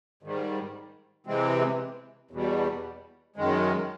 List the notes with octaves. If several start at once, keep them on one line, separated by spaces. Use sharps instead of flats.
G#2 D#3 G3
C3 E3 G#3 C4
E2 B2 G3
F#2 D#3 G#3